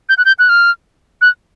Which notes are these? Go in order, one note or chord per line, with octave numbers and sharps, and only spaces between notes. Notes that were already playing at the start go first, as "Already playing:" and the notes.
G6
F#6
G6
F#6
F6
F#6